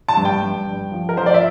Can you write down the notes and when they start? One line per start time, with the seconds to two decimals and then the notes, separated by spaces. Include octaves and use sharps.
0.09 A5
0.17 G2
0.25 G5
0.42 G2
0.67 G2
0.92 F3
1.09 A#4
1.17 F3 C5
1.26 D5
1.34 E5